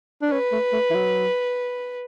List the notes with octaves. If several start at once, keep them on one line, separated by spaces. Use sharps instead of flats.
D4
C#4 B4
A3
A3
E3
F#3